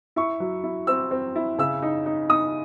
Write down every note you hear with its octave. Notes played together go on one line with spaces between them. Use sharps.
E4 C#6
F#3
E4
C4 E6
C4
E4
C#3 E6
D#4
D#4
D#4 D#6